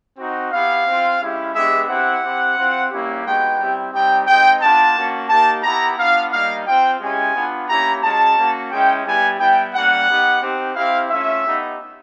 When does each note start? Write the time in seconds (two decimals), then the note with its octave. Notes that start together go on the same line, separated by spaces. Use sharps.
0.18 C4 D#4 F#4
0.51 B3 E4 G4 F5
0.86 C4 F4
1.21 G#3 C#4 E4 G4
1.54 G#3 B3 D4 G4 E5
1.88 C4 E4 G4 F#5
2.23 C4 E4 G4
2.56 C4 F4
2.90 G3 A#3 C#4 E4 G4
3.24 G#3 B3 D#4 F#4 G5
3.59 G3 C4 E4 G4
3.93 G3 C4 D#4 G4 G5
4.27 G#3 C4 D#4 G5
4.61 B3 D4 F4 A5
4.95 A#3 C#4 F#4
5.29 A#3 D#4 G4 A5
5.63 B3 E4 G4 A#5
5.97 B3 D4 F4 F5
6.31 G3 A#3 D#4 F5
6.66 C4 F4 G5
7.00 G#3 C#4 E4 G4 G#5
7.34 B3 D4 F4
7.68 A#3 C#4 E4 G4 A#5
8.02 G#3 C#4 F#4 A5
8.36 A#3 C#4 F#4
8.71 G#3 C#4 E4 G5
9.04 G3 B3 E4 G4 G#5
9.39 G3 B3 E4 G5
9.73 G3 A#3 C#4 F#5
10.08 B3 D#4 G4
10.42 C4 D#4 G4
10.75 C4 E4 G4 F5
11.10 A3 C#4 F4 E5
11.44 B3 D#4 G4